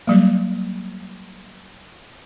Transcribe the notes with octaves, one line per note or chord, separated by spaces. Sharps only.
F#3 G3 A#3